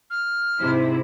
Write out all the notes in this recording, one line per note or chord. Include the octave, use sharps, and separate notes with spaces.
F6
G#2 C3 E4